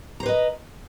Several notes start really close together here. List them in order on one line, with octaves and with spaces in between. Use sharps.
A#5 C5 B4 D#5